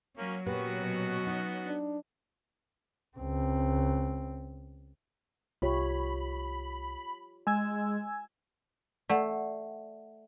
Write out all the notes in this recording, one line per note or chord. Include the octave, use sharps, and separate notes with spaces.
F#3 A#3 C#4
A#2 B3 C#4 F#4 G4 B4
B2
D#4
D4
C#2 C4
C2 F4 G4 C#5 B5
G#3 G#5 E6 G#6
A3 D5 F#5